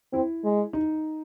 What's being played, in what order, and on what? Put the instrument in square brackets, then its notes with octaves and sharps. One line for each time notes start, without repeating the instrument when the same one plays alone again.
[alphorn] C4 [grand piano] E4
[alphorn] G#3
[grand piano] D#4